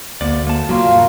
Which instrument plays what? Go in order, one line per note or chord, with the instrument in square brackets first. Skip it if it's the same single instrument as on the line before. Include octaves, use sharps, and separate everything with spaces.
[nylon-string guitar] D2 [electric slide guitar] A#3 D5
[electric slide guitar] A#3 A5
[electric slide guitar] C#3 A#3 [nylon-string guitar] F#3 [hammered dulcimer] F4 A#4
[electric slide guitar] G2 B2